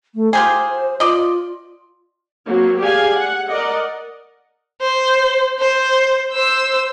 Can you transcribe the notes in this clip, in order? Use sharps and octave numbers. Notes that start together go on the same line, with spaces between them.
A3
F4 G4 G#4 C5
F4 D5 D#5
F#3 A#3 C4
G4 G#4 D5 F5 G#5
F#5
A#4 D5 D#5 F#5
C5
C5
C5 E6